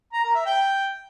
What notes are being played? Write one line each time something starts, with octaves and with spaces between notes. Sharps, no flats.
A#5
A#4
E5
G5